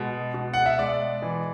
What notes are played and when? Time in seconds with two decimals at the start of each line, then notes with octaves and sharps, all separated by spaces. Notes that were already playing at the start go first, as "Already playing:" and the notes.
Already playing: B2 G#3
0.34 B2
0.53 F#5
0.66 E5
0.78 G#3 D5
1.22 E3